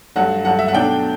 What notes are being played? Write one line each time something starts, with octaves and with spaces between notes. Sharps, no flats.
G2 F#3 A3 F#5
G2 F#3 A3 F#5
E5
F#5
B2 F#3 A3 D4 G5